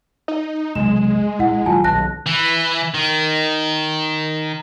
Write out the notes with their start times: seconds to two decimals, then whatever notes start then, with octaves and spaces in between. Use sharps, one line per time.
0.28 D#4
0.75 F1 B1 G#3 E7
1.39 A#1 E4 F#5
1.66 D#1 F#3 F4 G#5 A5
1.84 B1 A5 F#6 A#6
2.27 E3
2.95 D#3